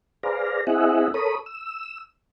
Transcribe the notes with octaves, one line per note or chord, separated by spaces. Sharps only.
G#4 B4 C5 D5 F5 A#5
C4 E4 G#4 D#5 E5 F#5
A4 A#4 C#5 B5 D#6
E6